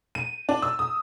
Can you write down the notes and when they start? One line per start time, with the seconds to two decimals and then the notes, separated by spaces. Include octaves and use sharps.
0.15 D#7
0.49 D4
0.62 E6
0.79 D#6